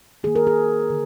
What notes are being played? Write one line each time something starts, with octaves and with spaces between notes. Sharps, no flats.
D#3 A#3 G#4
A#4
G#4
D3